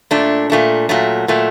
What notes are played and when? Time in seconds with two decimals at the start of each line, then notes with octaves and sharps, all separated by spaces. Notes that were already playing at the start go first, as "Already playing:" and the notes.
0.11 A#2 A3 D4
0.50 A#2 A3 D4
0.89 A#2 F#3 A3
1.28 A#2 F#3 A3